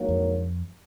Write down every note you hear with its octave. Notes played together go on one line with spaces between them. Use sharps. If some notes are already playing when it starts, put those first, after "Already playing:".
Already playing: A#1 G#2 F#3 A#3
F2